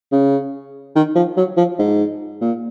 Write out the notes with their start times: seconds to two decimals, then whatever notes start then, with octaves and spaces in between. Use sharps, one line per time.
0.12 C#3
0.96 D#3
1.16 F3
1.37 F#3
1.57 F3
1.79 G#2
2.41 A#2